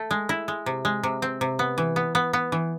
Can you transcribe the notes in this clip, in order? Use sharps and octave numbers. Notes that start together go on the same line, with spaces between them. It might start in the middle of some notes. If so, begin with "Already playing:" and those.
Already playing: A3
G#3
E4
G#3
C3
G#3
C3
C4
C3
B3
E3
B3
B3
B3
E3